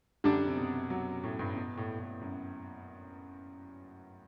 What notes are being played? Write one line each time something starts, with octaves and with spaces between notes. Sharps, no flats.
F#2 D3 G3 D4
C3
B2
F#3
A2
G2
B2
A2
A2
F#2